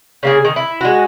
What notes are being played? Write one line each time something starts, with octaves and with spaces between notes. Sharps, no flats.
C#3 A#3 G#4
D#3
E4
G#3 F#4